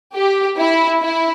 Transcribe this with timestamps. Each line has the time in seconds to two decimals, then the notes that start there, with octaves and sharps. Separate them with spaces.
0.15 G4
0.58 E4
1.00 E4